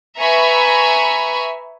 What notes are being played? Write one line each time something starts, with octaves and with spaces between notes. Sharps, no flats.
B4 E5 G#5 A#5 B5 C#6